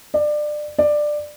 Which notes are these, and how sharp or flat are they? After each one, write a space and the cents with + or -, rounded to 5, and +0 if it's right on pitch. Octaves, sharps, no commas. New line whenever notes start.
D5 +25
D5 +15